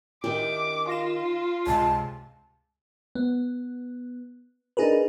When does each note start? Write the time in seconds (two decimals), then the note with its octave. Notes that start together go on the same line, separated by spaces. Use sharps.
0.24 D#3 D4 E4 G4 D6
0.89 F4 A#6 E7
1.67 C#2 G2 C3 G#3 A5
3.15 B3
4.77 D4 D#4 G#4 A#4 B4